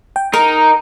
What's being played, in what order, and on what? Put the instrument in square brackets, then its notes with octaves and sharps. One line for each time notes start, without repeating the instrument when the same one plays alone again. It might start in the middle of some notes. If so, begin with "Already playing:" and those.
[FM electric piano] G5
[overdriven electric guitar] D#4 [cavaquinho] A#4 [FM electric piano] A#5